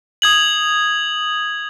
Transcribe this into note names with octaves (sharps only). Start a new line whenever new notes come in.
D#6 G#6 F#7